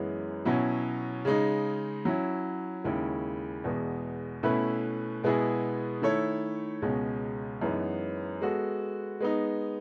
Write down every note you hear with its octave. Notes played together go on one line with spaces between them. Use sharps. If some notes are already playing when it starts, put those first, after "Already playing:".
Already playing: F#2 E3 G#3 B3
B2 F#3 C#4 E4
C#3 G#3 D#4
F#3 C#4 E4
D#2 C#3 G#3 C#4 E4
E2 B2 G#3 B3
B2 A3 C#4 E4 B4
B2 G#3 B3 E4 G#4
D#3 A3 E4 A4 C#5
C#2 B2 G#3 C#4
F#2 E3 G#3 B3 D#4
G#3 B3 F#4 A4
G#3 B3 D#4